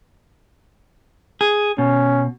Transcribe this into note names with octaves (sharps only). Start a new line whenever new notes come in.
G#4
B2 C#4